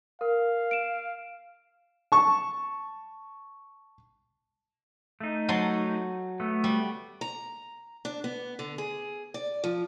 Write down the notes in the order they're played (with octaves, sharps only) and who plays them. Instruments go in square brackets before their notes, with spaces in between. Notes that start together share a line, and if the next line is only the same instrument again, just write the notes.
[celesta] A#4 [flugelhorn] F5
[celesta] D7 E7
[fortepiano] A5 C#6
[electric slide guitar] A3 D#4
[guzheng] F#3 A5 C6
[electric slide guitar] A3 B3
[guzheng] G3
[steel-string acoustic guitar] A#5
D4
B3
D3
G#4
D5
F3